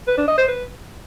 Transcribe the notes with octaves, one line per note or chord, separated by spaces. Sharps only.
B4
D4
D#5
C5
B4